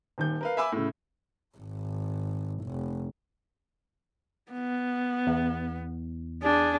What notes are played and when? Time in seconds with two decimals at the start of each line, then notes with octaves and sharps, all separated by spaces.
0.18 D#1 D#2 G6
0.41 A#4 B4 F5
0.57 E5 G#5 B5 D6 E6
0.72 A2 C#3
1.58 G#1
2.65 F1
4.52 B3
5.27 E2
6.43 D4 G#4